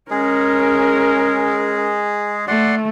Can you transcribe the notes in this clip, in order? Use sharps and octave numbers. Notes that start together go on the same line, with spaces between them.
G#3 C#4 G#4 A#4
A3 D5 F#5 C6